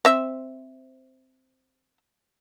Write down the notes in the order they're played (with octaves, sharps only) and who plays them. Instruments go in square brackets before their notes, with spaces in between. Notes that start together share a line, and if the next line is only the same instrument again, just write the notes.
[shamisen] C4 E5